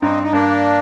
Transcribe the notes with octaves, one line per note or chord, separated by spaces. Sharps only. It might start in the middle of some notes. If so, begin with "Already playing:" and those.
G2 C4 D#4
D#4
G2 A#3 D4